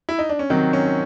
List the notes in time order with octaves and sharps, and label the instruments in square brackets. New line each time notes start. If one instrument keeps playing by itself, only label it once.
[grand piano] E4
D#4
D4
C#4
C3 D#3 F#3 C4
C#4